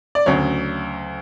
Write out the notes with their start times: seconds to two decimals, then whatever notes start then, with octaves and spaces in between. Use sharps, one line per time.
0.15 D5
0.26 D2 C#3 F#3 C#5